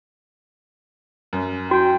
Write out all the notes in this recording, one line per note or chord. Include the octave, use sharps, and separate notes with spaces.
F#2
F#4 G5